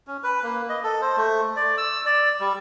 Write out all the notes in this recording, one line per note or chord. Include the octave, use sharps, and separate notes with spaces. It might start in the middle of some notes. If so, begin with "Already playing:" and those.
C#4
B4
A#3
D#5
A4
C5
A3
D5
E6
D5
G3